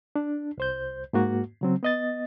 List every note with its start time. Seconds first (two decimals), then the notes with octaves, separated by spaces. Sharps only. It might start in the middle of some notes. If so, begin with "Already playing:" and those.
0.16 D4
0.58 C2 C5 G6
1.13 G#2 A#3 F#4
1.61 C#3 F#3 C4
1.83 B3 D#5 A6